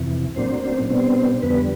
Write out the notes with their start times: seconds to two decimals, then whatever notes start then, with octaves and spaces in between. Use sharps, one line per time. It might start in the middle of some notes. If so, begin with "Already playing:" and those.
Already playing: F2 C3 E3
0.36 A2 F#3 A#3 C4 D4 C5
0.63 C4 C5
0.90 B2 G3 B3 C4 D4 C5
1.42 F2 D3 G3 B3 B4